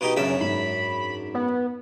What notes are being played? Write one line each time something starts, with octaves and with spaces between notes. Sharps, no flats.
B2 D#4 G4
F#2 C#3 D4 E5
G#2 B5
B3